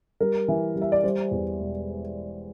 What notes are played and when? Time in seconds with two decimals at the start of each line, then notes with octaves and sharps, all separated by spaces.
0.20 G3 A#4
0.48 E3
0.76 G3
0.82 E5
0.92 D5
1.04 G3 C5
1.31 E2
1.60 E1